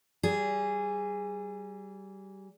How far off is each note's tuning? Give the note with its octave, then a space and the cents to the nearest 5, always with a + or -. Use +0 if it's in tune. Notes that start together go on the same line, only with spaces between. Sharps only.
G3 -25 G#4 -15